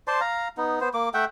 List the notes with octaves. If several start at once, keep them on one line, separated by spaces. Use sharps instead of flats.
C5 D5 A5 C6
F5 A#5
B3 D#4
B3 C5
A#3 D6
A3 E5 F#5 G5